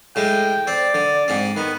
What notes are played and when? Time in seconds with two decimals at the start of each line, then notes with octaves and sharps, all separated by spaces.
0.16 A2 G#3 G5
0.67 C4 D5
0.94 D3
1.28 G#2 C4
1.57 D#3 B3